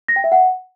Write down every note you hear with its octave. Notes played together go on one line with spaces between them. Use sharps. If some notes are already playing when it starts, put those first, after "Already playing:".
A#6
G5
E5
F#5